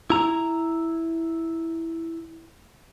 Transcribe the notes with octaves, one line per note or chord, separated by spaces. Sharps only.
E4 A#5